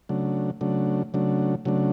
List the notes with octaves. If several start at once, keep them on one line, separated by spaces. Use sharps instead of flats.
C#3 F#3 A3 D4
C#3 F#3 A3 D4
C#3 F#3 A3 D4
C#3 F#3 A3 D4